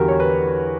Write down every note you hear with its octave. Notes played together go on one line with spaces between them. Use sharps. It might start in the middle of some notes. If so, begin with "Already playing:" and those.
Already playing: E2 D3 G3 F#4 G4 A#4
C#5
B4